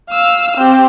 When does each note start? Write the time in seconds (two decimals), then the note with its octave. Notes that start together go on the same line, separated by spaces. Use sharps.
0.10 F5 E6
0.57 C4 G4